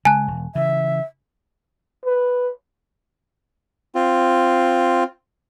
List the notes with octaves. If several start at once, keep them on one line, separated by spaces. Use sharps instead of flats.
C#3 G#3 G#5 A5 F#6
E1
C#3 E3 E5
B4
C4 F4